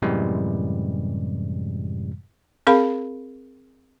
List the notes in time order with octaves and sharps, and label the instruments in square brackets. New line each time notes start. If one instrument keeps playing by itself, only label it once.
[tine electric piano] F#2 A2 C3 E3 G3 G#3
[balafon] C4 G#4 A#4 F5 B5